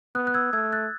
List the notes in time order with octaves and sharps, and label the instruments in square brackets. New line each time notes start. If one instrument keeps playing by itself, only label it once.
[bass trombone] B3 [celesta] D#6 F#6
[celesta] F#6
E6 G#6
[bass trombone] A3 [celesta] E6 G#6
[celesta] F#6 A6